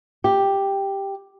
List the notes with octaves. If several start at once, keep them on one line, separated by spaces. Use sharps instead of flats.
G4